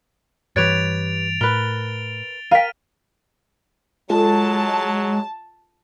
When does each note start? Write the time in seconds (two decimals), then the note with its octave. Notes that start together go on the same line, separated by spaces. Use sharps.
0.56 G2 E3 G4 B4 C#5 A6 D7 F7
1.41 A2 A#4 B4 G7
2.51 A#4 F5 G5 B6 D#7
4.10 F#3 G#3 F4 A4 A5